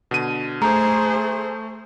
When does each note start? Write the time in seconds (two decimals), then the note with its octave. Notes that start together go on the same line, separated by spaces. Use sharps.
0.11 B2 D3 D#7
0.62 A3 G#4 C5 A#5